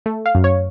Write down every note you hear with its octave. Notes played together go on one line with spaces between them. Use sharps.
A3
F5
F#2
C#5